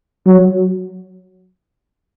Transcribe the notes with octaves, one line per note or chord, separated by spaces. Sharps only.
F#3